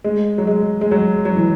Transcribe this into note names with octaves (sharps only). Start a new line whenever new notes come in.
G#3
F#3
G#3
G#3
F#3
F#3
E3